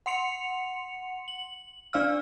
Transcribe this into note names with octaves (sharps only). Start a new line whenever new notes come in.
F#5 C6 C#7 F7
F#7
D4 D5 F5 E6 F6